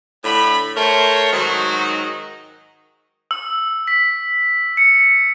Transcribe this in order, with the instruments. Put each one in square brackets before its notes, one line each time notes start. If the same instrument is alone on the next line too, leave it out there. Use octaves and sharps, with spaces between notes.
[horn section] A2 D3 B5
A3 A#4 C5 C#5
G#2 D#3 F#3 D#4 F#4
[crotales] E6
B6
C#7